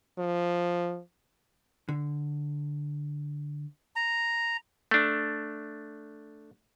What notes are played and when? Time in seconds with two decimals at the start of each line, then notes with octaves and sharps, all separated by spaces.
0.18 F3
1.89 D3
3.96 A#5
4.91 A3 D4